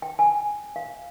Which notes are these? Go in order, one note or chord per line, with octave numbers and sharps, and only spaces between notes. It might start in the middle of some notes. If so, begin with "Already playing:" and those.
G5
G#5
F5